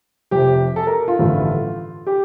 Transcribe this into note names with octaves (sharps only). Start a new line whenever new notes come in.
F1 F2 C3 G4
A4
A#4
F4
A1 G2 D3 F3 A3
G4